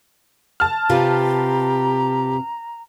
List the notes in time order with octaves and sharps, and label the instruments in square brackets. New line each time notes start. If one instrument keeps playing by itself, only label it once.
[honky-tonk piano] A5 F6
[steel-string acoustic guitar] C3 F4 B4 [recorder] G4 [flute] A#5